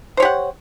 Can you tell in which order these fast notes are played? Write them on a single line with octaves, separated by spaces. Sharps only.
C5 C#5 G4 F#5